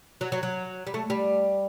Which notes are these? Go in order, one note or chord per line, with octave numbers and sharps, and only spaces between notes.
F#3
F#3
F#3
G3
A3
G3